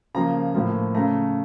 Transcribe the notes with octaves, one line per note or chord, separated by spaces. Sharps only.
C#3 F3 A#3 A#5
A2 F3 A#3
C#3 A3 A#5